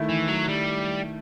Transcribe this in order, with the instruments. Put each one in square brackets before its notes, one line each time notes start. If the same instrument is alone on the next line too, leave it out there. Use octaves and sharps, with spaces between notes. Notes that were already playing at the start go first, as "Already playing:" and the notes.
Already playing: [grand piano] D#3 A3 E4
[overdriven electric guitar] E3
F#3
G3